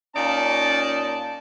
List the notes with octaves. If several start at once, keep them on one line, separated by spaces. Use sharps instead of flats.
A#2 C#4 D#4 D5 A5